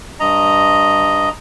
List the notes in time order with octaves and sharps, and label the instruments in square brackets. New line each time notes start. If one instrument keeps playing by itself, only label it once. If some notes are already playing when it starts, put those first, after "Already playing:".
[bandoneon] G2 D#5 A#5